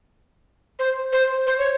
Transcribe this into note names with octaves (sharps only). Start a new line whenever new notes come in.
C5
C5
C5
C#5